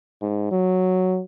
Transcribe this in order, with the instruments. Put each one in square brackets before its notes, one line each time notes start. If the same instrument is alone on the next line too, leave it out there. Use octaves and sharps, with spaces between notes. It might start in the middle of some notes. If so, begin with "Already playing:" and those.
[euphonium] G#2
F#3